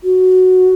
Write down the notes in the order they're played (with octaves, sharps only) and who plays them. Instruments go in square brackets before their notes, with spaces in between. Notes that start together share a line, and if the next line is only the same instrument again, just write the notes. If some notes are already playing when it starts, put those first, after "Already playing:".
[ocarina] F#4